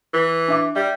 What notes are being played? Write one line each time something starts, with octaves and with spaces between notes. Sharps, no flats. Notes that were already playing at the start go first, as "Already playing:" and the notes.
E3
D4 E5 D6
G3 E5